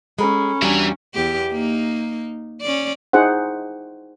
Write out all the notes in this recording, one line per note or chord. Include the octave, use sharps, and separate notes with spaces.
G#3 C#4 A4 A#5 B5
E2 G3 D4 E4 F#4 G#5 A#5 F7
E2 G4
A#3 D#4
C#4 D5
D#4 E4 G#4 C5 F#5